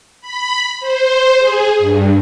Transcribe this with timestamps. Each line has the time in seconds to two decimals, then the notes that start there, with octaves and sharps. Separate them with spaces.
0.21 B5
0.80 C5
1.39 G#4
1.79 G2